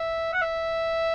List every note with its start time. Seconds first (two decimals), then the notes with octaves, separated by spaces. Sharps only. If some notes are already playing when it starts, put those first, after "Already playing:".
Already playing: E5
0.33 F#5
0.41 E5